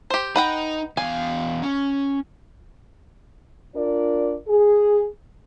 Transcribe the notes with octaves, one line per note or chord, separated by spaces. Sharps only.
G4 C5
D#4 B4 F#5 G5
E2 F5 G#5
C#4
D4 F4 A#4 D5
G#4